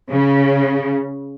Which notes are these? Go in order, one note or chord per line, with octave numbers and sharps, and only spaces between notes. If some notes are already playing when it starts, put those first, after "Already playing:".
C#3